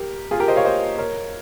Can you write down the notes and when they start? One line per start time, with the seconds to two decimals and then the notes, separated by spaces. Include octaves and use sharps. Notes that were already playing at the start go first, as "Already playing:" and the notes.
Already playing: G4 A#4
0.31 F4 G#4
0.40 G4 A#4
0.48 C5 D#5
0.56 C#5 F5
0.65 C5 D#5
0.98 A#4 C#5